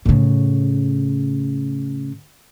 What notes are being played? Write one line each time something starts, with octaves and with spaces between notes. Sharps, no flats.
A2 C#3